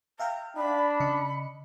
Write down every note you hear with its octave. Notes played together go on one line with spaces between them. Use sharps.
E5 F5 G5 A#5
D4 B5
C#3 D#5 C#7